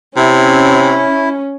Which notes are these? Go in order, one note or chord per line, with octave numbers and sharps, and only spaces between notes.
C3 C#4 E4